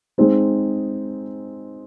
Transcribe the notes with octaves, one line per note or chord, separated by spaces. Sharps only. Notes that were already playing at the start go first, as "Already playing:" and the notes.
G#3 C4 D#4